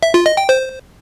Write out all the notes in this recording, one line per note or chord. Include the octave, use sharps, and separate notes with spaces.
E5
F4
D#5
G5
C5